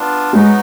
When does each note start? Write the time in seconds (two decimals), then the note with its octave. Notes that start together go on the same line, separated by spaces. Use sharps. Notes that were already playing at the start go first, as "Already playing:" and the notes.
Already playing: B3 D4 F4
0.33 F#3 G#3 B3 D#4 F#4